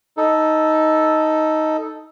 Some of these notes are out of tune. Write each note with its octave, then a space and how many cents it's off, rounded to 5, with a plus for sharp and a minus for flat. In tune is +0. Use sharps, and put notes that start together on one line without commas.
D#4 +10 A4 +0